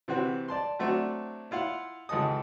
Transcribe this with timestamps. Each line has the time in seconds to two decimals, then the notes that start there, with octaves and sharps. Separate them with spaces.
0.08 C3 E3 C4 F#4
0.48 D5 A5 C6
0.79 F#3 A3 C4 D4 F#4
1.51 E4 F4 F5 F#5
2.09 G#1 C#2 E3 A4 D#5 D#6